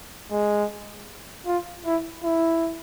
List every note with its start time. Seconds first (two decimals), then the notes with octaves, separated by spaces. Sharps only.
0.32 G#3
1.46 F4
1.85 E4
2.24 E4